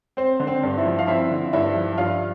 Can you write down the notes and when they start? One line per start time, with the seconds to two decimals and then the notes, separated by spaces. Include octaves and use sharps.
0.17 C4 C5
0.40 D3
0.47 C4 C5
0.63 G2
0.77 E4 E5
0.85 F3
0.99 F5
1.07 C4 E4 E5
1.31 D3
1.53 G2 E4 E5
1.76 F3
1.98 G2 F4 F5